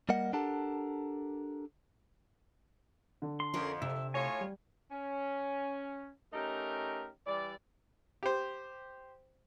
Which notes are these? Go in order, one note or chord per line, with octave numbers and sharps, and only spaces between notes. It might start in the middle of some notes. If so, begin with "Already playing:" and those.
G3 A#3 A#4 D#5 F#5
D4 G4 A4 A#4 F#5 A5
D3
C6
F2 C#4 G#4 A#4
C3 E5
A2 F4 C#5 G#5
G3
C#4
A3 C#4 D#4 G4 A#4
E3 G3 D5
G4 C5